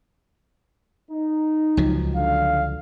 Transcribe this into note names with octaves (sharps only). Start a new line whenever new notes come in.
D#4
C#2 F3 F#3
D3 F5